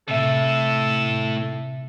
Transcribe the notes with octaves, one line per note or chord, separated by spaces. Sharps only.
A2 C3 A4 E5